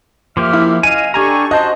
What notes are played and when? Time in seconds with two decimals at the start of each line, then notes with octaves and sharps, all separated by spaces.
0.37 F3 A#3 G4 E5 F6
0.53 E4
0.83 D#5 F5 G#5 D#7
1.14 D4 G4 A4 G#5 A#5 C#6
1.51 F#4 C5 D#5 A5